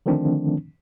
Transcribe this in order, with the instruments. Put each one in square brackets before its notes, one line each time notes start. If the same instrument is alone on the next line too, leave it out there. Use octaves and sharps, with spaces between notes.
[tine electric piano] D3 D#3 F3 A3 C4 D4